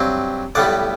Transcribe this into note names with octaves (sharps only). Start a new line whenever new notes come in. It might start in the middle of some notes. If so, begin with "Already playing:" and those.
Already playing: G2 F#3 C4
B1 A2 G3 B3 D5 F#5